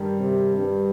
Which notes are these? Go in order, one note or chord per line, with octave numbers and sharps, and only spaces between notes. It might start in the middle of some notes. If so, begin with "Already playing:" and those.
Already playing: G2 D#3 G3
C3
G2